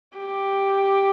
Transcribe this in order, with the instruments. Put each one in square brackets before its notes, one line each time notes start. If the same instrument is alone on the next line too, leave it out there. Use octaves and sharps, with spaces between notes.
[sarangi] G4